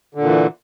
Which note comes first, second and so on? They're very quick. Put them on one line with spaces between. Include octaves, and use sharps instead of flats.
D3 A#2 E3